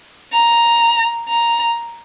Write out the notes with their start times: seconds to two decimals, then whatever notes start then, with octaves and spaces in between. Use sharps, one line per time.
0.33 A#5
1.29 A#5